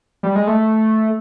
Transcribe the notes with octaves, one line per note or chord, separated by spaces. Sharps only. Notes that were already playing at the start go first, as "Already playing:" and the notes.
G3
G#3
A3